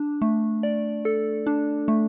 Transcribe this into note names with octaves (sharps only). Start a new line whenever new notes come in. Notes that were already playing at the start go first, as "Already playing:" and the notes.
Already playing: D4
A3
D5
A4
D4
A3